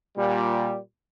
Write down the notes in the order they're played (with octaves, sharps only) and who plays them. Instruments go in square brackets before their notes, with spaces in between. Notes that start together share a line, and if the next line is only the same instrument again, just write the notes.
[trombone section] A#2 G3